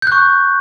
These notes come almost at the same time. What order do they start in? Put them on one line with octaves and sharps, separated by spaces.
G6 F#6 C#6